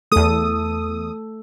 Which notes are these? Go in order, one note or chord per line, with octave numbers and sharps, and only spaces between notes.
E2 A3 A4 D#6